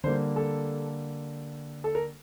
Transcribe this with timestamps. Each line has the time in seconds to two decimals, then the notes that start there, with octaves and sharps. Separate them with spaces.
0.04 D3 G3 A#3 C5
0.36 A4
1.84 A4
1.95 A#4